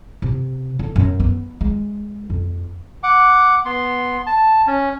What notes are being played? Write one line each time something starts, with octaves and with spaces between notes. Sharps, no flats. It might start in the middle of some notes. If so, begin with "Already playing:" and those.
C3
D3
F#2
B3
G#3
F2
F#5 D6
B3 C6
A5
C#4